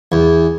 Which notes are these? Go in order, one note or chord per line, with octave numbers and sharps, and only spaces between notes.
E2